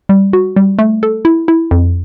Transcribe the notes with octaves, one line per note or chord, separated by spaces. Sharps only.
G3
F#4
G3
A3
A4
E4
E4
F2